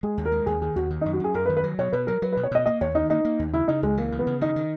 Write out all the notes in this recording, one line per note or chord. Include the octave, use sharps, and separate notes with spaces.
G#3 G#4
D#2
A#4
G#3
D#2 G#4
D#3 G#4
D#2 F#4
D#3
D#4
F#2
F#4
F#2 G#4
F#2 A#4
B4
D#3
B4
F#3
B2 C#5
B2 B4
F#3 A#4
F#3 B4
B4
B2
C#5
B2 D#5
A#3 D#5
D#2 C#5
D#3 D#4
A#3 D#4
A#3
D#2
C#3 E4
C#3 D#4
C#2 G#3
E3 A#3
C#3
B3
C#3
D#3 D#4
D#3